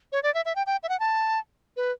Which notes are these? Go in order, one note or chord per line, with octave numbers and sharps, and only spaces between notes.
C#5
D5
E5
E5
G5
G5
E5
F#5
A5
B4